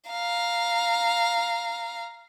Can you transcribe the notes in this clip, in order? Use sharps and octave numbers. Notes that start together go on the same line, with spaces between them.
F5 A#5